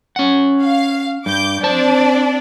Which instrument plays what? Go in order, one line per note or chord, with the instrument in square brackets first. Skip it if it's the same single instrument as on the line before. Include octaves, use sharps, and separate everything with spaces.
[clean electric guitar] C#4 F#5
[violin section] F5
[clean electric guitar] G2 [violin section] D6 G6
[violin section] C4 D4 D5 [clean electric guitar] C5 A5